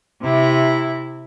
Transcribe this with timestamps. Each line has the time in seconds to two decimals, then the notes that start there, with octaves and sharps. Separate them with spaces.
0.22 C3 E4